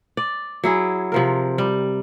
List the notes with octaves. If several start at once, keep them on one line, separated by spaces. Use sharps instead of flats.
D5
F#3 E4 G#4
C3 F3 A#4
G3